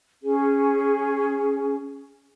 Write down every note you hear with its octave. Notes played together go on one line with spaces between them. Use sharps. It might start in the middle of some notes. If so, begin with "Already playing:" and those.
C#4 G#4